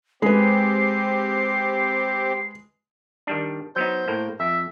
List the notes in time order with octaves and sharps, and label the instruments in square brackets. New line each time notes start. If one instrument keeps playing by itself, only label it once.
[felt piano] G#3 B4 [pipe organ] C4 G4 [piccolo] C7
[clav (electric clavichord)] D#3 G3 D4
[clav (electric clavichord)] F#3 B3 D#4 [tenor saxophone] C5
[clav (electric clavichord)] A2 A#3
[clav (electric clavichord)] F2 [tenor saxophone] E5